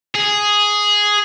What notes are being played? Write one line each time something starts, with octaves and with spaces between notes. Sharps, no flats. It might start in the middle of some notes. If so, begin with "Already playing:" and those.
G#4